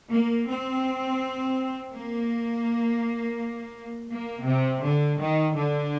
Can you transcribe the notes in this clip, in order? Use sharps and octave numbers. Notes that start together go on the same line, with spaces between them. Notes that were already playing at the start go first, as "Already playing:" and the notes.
A#3
C4
A#3
A#3
C3
D3
D#3
D3